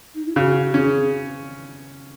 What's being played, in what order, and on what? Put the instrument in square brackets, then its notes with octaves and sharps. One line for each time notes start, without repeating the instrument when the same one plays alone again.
[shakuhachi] D#4
E4
[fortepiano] C#3 [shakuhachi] F#4
[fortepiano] C#4 [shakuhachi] G#4